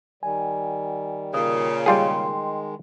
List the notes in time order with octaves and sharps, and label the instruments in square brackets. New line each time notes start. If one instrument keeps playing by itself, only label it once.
[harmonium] D#3 G3 [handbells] G#5
[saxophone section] A#2 C#3 [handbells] A#4 D#6
[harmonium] D#3 G#3 [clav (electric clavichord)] G3 F4 G#4 [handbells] G5 C6